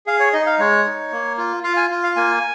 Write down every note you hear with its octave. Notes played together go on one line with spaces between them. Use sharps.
G#4 F5
C#5
D#4 D#5
F5
G#3 C#5
D#4
A#3
F4
F4 F5
G#5
F4
F5
A#3 G#5